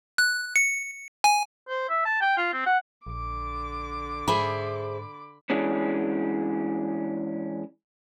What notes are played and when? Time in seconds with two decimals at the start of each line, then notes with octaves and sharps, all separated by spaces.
0.18 F#6
0.56 C#7
1.24 G#5
1.69 C5
1.89 E5
2.05 A5
2.21 G5
2.37 F4
2.53 C4
2.66 F#5
3.06 A#1 D3 D6
4.28 G#2 G#4 C5 E5 B5
5.50 E3 G#3 C#4 D4